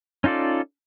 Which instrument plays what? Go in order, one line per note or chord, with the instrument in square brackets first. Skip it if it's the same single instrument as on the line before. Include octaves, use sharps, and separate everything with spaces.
[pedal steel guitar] C#4 D#4 F4 A4 D5